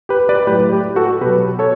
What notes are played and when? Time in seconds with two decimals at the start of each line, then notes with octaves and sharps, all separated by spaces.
0.09 G4 B4
0.29 B4 D5
0.47 A2 F#3 G4 B4
0.72 G4
0.96 F#4 A4
1.21 B2 F#3 G4 B4
1.59 A4 C#5